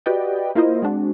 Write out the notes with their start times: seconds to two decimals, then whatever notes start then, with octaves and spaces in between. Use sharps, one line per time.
0.06 F#4 G4 B4 D5 D#5 G5
0.55 A#3 E4 F4 A#4 C5 D#5
0.82 G#3 C4 D4 F#4